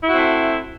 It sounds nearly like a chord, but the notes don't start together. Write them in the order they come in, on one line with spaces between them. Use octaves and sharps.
E4 F#4 C4 A3